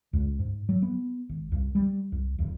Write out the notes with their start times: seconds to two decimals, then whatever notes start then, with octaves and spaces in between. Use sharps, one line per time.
0.13 C#2
0.39 G#2
0.69 F#3
0.82 B3
1.29 G#1
1.52 C2
1.75 G3
2.12 C2
2.39 D1